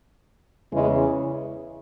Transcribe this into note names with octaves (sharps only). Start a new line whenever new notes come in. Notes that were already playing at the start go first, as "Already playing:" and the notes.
E2 C#3 E3 G#3